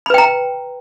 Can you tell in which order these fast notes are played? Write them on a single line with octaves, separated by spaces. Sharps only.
B5 B4 G5 A#5